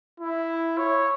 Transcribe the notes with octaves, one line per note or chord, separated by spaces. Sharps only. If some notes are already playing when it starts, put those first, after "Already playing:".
E4
C#5